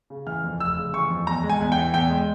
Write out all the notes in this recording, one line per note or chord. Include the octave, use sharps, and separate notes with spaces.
C#3
E3 F6
F2
F1 E6
C#3
E3 C#6
F2
E2 A#5
G#3
G#5
E2
G5
E3
E2 G5
G#3